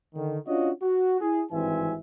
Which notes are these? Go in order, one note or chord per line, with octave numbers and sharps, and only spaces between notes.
D3 D#3
C#4 D4 F4 F#4 C#5 D#5
F#4
E4 G#4
G#1 G2 E3 C4 E5 G#5